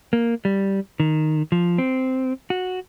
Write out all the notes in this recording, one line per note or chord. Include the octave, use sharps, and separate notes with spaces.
A#3
G3
D#3
F3
C4
F#4